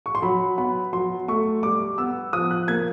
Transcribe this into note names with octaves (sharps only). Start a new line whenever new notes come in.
C#6
C6
F#3 B5
B3 B5
F#3 C6
A3 C#6
G3 D6
B3 E6
F3 D#6
F#6
A#3 G#6